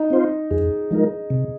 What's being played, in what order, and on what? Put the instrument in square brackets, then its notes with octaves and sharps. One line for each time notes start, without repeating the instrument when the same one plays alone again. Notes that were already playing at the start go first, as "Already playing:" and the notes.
Already playing: [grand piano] D#4
[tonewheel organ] C4 F4 C5
[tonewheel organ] F2 [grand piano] G#4
[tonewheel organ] F3 G#3 D#4 A#4
C3